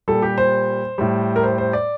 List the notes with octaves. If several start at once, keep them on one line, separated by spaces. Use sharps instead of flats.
A#2 G3 A4
G4
C5
A2 G3
A#4
C5
C5
D5